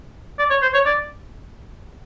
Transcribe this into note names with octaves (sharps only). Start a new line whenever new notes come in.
D5
C#5
C5
C#5
D5